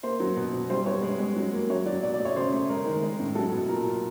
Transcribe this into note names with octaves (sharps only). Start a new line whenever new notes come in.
A#3 C5
F#3
B2
B2
G3 C5
B3 C#5
G#3
G#3
F#3
A#3
F#3 C#5
F#3 D5
B2 D5
D5
A3
C#5
C#3 C5
A3
G#3 A#4
D#3
G#3
A2
F#3 A4
B2
A#2 A#4
A#2